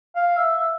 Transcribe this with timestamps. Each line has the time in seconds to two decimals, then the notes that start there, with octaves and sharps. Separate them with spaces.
0.16 F5
0.37 E5
0.58 E5